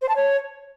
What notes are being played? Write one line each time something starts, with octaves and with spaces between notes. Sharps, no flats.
C5
A5
C#5